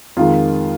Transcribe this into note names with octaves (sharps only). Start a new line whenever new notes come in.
F2 D#3 G#3 F4